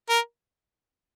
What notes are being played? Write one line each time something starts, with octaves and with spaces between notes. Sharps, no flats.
A#4